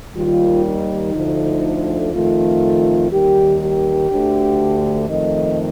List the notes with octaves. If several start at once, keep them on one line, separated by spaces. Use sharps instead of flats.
D#2 D#3 G3 F4
D#4
D2 D3 F3 A3
F2 D#3 A3 F4
D#2 D#3 G3 G4
G4
D2 D3 A3
F2 D#3 A3 D#5